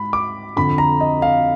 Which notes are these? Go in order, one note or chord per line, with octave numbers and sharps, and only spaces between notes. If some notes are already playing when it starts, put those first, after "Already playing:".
Already playing: G#2 B5
D6
F2 D3 B5
A#5
D#5
F5